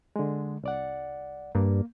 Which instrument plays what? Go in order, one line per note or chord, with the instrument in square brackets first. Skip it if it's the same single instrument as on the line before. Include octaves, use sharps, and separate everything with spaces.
[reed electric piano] D3 G#3
C2 D5 F#5
[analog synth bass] G2 [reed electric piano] A#3